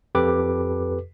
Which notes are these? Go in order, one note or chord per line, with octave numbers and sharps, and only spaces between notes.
F2 G4 A4 B4 D6